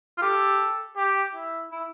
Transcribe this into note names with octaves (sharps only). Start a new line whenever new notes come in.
F4
G4 A4
G4
E4
E4